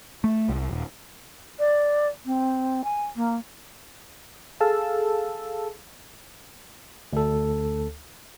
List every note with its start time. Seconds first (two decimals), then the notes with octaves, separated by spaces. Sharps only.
0.24 A3
0.48 C2
0.71 D#1
1.59 D5
2.25 C4
2.84 G#5
3.16 A#3
4.60 G#4 A4 F5 A5 E6
7.13 D2 A4